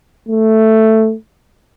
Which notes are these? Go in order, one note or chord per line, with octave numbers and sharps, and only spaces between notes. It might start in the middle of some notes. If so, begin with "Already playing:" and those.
A3